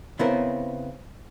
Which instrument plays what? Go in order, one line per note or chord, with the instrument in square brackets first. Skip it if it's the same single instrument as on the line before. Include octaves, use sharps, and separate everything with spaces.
[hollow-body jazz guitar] C#3 B3 C4 E4 A#4 C5